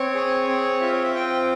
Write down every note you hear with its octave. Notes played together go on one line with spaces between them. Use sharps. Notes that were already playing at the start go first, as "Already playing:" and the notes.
Already playing: C4 C#5
G#4
C4
F4 E5
C#5
E5
C4 G5